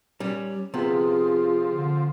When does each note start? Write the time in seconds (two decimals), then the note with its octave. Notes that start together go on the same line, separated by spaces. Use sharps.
0.20 G3 C#4
0.74 C3 F3 B3 C4 F4 G#4
1.70 D3